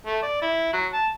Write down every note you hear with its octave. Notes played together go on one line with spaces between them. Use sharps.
A3
D5
E4
F#3
A5